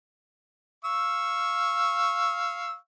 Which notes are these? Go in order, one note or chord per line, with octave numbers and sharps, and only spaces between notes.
F5 C#6 E6